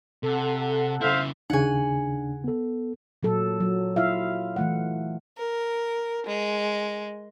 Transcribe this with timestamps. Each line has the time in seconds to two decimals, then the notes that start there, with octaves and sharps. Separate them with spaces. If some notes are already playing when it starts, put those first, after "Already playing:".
0.23 C3 A4 F#5
1.01 C#3 E4 C5 E5 F5
1.50 D#2 C#3 D4 D#4 G#4 F#5 G#5
2.44 B3 A4
3.23 A#2 F#3 A4
3.60 F#3
3.96 E4 F4 E5 F5
4.56 E3 A3 F#5
5.38 A#4
6.27 G#3